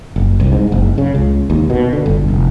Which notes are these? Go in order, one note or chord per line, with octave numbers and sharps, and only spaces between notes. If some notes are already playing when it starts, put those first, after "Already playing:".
F#1
C2
G#2
F#1
C#3
C#2
D#2
B2
D3
G1
F1